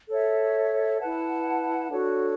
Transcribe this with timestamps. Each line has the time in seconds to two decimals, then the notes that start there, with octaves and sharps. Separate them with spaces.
0.09 A4 C#5 E5
1.00 E4 B4 F#5 A5
1.91 D4 F#4 A4 C#5